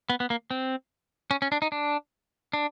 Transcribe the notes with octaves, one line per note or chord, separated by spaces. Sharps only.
B3
B3
A#3
C4
C#4
C#4
D4
D#4
D4
D4